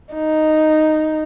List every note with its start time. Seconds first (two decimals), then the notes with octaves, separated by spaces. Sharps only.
0.14 D#4